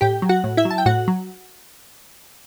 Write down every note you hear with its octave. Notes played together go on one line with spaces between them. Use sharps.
A2 G4 G5
F#3
F#4 F#5
A2
E4 E5
F#3
A5
G5
A2 F#4 F#5
F#3